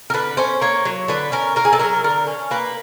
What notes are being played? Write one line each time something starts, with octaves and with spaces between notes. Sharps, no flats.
A#4
D3 B4
C#4 C5
A#3 C#5
F#3
D3 B4
C#4 A#4
A#3 A#4
G#4
A4
F#3 A#4
D3 A#4
C#4
A#3 B4